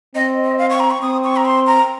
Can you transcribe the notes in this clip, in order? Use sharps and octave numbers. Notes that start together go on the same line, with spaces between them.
C4 D#5
D#5
F5
C#6
A#5
C#6
C4 D#6
C#6
A#5
C6
A#5